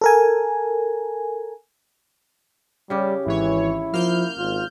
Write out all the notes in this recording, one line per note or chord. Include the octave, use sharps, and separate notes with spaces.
A4 A#4 G#5
C#3 G3 G4
G#1 E3 E4 C#5
F3 A#3 F6 G6
G#1 F4